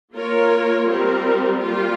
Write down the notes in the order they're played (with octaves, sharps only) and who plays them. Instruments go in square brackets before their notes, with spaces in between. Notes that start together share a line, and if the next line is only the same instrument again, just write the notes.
[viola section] A#3 F4 A#4 C#5
G3 C4 F4 A#4
G3 A#3 F4